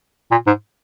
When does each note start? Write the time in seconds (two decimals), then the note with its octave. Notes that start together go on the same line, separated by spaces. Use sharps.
0.31 A#2
0.47 G#2